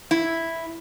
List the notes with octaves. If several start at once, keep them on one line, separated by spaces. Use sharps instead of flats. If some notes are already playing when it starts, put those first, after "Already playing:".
E4